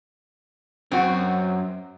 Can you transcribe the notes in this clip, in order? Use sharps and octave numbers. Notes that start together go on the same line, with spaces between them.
F#2 C4 F#4